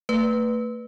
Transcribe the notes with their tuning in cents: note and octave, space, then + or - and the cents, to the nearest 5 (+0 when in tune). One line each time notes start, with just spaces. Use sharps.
A3 +35 B4 +0